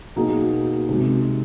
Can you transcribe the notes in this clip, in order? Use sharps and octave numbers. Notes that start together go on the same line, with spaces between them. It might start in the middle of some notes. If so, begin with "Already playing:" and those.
B2 F#3 A#3 D#4 G#4
C3 D#3 G#3